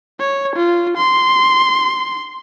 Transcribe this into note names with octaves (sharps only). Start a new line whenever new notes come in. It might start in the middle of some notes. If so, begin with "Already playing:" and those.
C#5
F4
C6